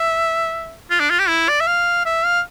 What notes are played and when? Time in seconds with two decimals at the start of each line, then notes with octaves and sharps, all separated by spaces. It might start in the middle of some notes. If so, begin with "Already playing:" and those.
Already playing: E5
0.90 F4
1.00 D4
1.10 F4
1.19 G4
1.28 E4
1.48 D5
1.60 E5
1.67 F5
2.06 E5
2.25 F5